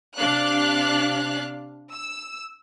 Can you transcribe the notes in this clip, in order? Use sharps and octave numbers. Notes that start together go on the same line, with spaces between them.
C3 D4 F5 F#6
E6